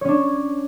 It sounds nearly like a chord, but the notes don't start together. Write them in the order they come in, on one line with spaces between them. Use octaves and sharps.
C#5 C#4 D4